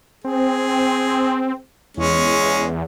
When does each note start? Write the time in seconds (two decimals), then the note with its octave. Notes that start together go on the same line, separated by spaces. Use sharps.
0.24 C4 G#4
1.97 E2 G#3 C#4